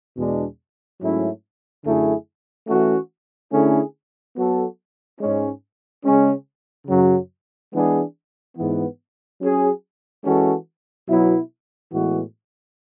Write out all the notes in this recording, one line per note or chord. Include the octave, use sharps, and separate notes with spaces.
E2 B2 G#3 D4
G#2 F#3 A3 C#4 E4
F#2 D3 A3 E4 G#4
E3 A3 C#4 F#4
D3 A3 C#4 E4 G#4
F#3 B3 F#4 A4
G#2 G#3 C#4
C#3 G#3 C#4
F#2 C#3 F#3
E3 G#3 B3 D4 G#4
G#2 E3 B3
F#3 C#4 G#4
E3 G#3 C#4 F#4 A4
B2 F#3 B3 E4
A2 E3 G#3 B3 F#4